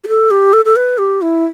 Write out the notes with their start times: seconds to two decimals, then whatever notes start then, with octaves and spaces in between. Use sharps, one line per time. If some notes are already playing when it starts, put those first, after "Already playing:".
0.04 G4
0.08 A4
0.31 G4
0.53 A4
0.65 A4
0.76 B4
0.98 G4
1.22 E4